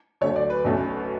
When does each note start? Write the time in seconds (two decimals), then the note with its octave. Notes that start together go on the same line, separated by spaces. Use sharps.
0.21 D2 D3 F#3 A3 C#5
0.36 D5
0.50 B4
0.65 B1 B2 A3 C#4